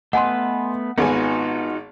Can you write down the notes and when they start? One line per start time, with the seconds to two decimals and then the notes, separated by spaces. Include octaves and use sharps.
0.13 A3 B3 B4 D#5 F#5 G#5 C6
0.98 G#1 B3 D#4 F4 F#4 G#5